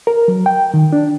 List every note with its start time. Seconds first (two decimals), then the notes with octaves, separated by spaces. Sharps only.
0.07 A#4
0.28 F#3
0.46 G5
0.74 D#3
0.93 D4